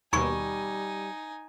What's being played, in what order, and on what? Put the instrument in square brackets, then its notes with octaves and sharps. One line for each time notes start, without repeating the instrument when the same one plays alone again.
[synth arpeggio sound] D#2 B2 [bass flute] G3 [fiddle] D#4 G#5 [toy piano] B5 C#6